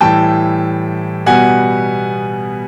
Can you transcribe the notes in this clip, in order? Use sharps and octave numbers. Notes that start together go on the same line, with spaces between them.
A2 E3 G3 G5 A5
B2 G3 B3 F#5 G#5